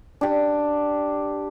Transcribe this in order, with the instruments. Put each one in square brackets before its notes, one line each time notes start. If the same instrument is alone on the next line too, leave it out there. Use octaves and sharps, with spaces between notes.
[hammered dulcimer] D4 G4